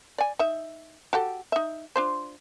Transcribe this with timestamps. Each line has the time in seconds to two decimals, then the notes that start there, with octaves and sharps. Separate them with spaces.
0.18 D5 G#5
0.39 D#4 E5
1.13 F#4 G4 A4
1.52 D#4 E5
1.96 D4 F4 C5